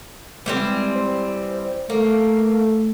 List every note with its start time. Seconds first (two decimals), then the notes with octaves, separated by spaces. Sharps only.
0.46 E3 G3 G#3 C4
0.95 C5
1.90 A3 A#3 A4